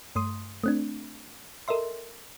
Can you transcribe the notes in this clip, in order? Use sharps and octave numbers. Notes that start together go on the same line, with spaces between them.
G2 A3 C6 D#6
A3 C4 D4
A4 A#4 D#5 E5 C6